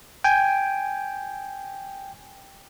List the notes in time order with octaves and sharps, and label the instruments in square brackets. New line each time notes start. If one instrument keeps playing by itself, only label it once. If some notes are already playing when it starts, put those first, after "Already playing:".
[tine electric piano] G5 G#5